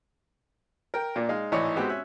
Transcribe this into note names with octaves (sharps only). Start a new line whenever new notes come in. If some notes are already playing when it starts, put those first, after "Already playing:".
A#4 G5
A#2 A#3 D4 F4
G#3 D#4 F5
G#1 A2 E3 D#4 C#5 D5
G#3 B3 C4 F#4 G4
C#4 E5 F#6